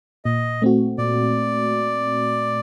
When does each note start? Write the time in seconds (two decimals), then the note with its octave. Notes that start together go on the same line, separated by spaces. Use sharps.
0.25 A#2 D#5
0.62 A3 C4 F#4
0.98 A#2 D5